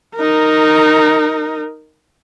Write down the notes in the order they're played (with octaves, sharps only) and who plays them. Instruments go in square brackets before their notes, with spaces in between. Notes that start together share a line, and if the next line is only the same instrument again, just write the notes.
[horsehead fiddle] D#4 A#4